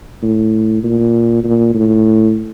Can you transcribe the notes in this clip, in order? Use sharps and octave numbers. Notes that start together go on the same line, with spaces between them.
A2
A#2
A#2
A2